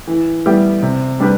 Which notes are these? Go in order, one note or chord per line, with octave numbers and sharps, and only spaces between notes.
E3
G3 B3 E4 G4
C3
G3 D4 G4 B4